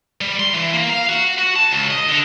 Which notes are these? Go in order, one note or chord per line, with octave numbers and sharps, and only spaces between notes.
G3
C6
E3
A#3
F5
F#4
F#4
A5
C#2
D#5
D3